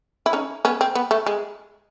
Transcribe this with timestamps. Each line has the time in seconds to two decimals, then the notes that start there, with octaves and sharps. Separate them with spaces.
0.26 E4
0.33 C#4 D#4
0.65 B3 C#4
0.81 C4
0.95 B3
1.11 A3
1.26 G#3